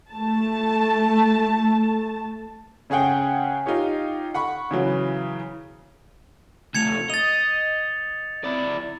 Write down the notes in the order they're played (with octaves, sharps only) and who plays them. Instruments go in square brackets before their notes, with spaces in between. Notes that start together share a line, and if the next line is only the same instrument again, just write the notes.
[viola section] A3 A5
[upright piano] C#3 C#4 G#4 F#5 G5
D#4 F4 G4 C#5
F#5 B5 C#6
C#3 E3 F#3
[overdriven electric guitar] C3 A3 [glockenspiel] G#6 C#7 F7
[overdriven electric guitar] D#5 [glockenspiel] A6 F7
[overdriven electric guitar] E4 D5